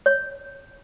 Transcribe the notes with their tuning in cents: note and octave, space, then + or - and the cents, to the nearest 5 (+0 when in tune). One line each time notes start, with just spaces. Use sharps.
C#5 -10